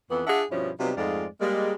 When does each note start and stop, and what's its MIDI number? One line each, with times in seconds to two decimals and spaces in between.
0.11 0.25 41
0.11 0.25 52
0.11 0.25 59
0.27 0.43 62
0.27 0.43 65
0.27 0.43 68
0.27 0.43 76
0.27 0.43 78
0.51 0.71 43
0.51 0.71 47
0.51 0.71 53
0.51 0.71 61
0.51 0.71 62
0.51 0.71 64
0.80 0.92 48
0.80 0.92 54
0.80 0.92 55
0.80 0.92 59
0.80 0.92 63
0.80 0.92 65
0.97 1.26 41
0.97 1.26 44
0.97 1.26 56
0.97 1.26 57
0.97 1.26 65
0.97 1.26 74
1.41 1.74 55
1.41 1.74 56
1.41 1.74 58